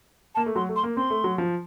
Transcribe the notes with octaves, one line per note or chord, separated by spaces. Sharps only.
A#3 A5
A3
F#3 C6
A3
C6
A#3
C4 C6
A3
F#3
F3